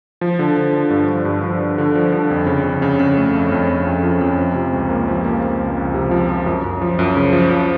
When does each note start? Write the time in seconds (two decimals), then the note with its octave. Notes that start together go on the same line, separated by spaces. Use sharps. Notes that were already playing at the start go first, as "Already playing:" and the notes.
0.21 F3
0.39 D3
0.57 D3
0.73 D3
0.90 G2
1.09 F3
1.25 G2
1.43 F3
1.60 F3
1.78 D3
1.95 F3
2.12 D3
2.30 F2
2.46 C#3
2.64 C#3
2.82 C#3
3.00 C#3
3.17 A3
3.34 F2
3.52 F2
3.69 F2
3.87 F2
4.03 F3
4.21 F2
4.38 F3
4.55 C3
4.73 C#2
4.90 A#3
5.08 F3
5.24 A#3
5.43 A#3
5.60 C#2
5.78 C#2
5.94 C3
6.11 F3
6.29 F3
6.46 F#2
6.64 F#2
6.82 F3
6.99 F#2
7.17 C#3
7.33 F3
7.50 F#2